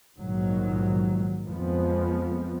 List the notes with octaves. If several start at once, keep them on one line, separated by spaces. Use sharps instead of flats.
A#1 G#2 D#3 F#3
F2 F3 G#3 B3